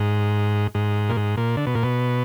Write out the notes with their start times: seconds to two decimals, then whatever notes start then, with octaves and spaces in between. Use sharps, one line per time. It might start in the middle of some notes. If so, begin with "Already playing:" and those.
Already playing: G#2
0.75 G#2
1.09 A#2
1.17 G#2
1.37 A#2
1.57 D3
1.67 B2
1.75 A#2
1.83 B2